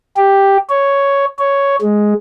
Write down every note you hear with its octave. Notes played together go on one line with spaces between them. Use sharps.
G4
C#5
C#5
G#3